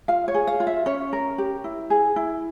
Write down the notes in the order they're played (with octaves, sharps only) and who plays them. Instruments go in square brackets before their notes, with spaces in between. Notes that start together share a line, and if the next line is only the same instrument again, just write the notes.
[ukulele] F4 F5
C#5
G#4
F5
F4
E5
C#4 C#5
A#4
G4
E4
G#4
E4